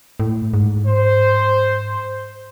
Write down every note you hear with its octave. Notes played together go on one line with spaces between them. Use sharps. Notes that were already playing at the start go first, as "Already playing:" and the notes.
A2
G#2
C5